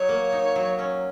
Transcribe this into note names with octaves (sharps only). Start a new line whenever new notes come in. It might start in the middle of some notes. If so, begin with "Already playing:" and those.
Already playing: F#3 D#4 C#5
A#3
D#4
F#3
C#4